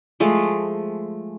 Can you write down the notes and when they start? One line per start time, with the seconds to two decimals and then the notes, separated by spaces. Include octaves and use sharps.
0.20 F3 G#3 A3